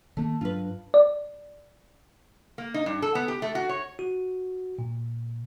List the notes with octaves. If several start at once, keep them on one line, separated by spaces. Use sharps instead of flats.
D#3 A3 A#3
G2 F#3 D4 F4 B4
D5
A#3
D#4
G2
A4
B3
G4
A3
F#4
C#5
F#4
A#2